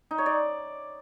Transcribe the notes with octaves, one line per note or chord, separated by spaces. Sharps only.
D#4
C#5
D5